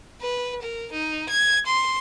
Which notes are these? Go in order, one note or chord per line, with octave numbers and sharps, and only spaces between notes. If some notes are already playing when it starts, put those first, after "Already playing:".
B4
A#4
D#4
G#6
C6